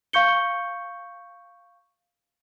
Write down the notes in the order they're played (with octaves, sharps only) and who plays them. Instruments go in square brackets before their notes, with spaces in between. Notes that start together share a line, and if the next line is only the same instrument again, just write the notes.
[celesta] F5 C#6 G6 C#7 G7